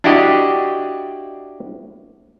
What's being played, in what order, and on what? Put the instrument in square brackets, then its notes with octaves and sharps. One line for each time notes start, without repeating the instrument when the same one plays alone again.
[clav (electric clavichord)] D4 E4 F#4 G4 D5 D#5